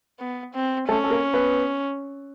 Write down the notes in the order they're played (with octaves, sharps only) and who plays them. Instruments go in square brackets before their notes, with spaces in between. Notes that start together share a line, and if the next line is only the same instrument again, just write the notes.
[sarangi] B3
C4
[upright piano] A3 A4 [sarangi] C#4
[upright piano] A4
A#3 A#4
B3 B4